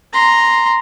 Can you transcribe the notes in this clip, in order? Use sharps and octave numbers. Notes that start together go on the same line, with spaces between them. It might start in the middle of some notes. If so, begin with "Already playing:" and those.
A#5 C6